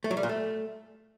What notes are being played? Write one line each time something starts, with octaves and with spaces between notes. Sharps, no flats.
A3
F#3
G3
A#2
A3